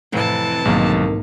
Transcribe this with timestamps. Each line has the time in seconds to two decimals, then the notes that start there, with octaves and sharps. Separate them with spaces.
0.12 F2 A2 C3 E3 A5
0.65 B1 G#2 D#3 A#3